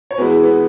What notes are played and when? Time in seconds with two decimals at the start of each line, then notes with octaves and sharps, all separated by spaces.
0.11 C#5
0.18 E2 E3 G#3 F#4 B4
0.30 E4 G#4
0.43 B3